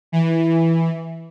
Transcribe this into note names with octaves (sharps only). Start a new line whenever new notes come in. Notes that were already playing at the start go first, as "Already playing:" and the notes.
E3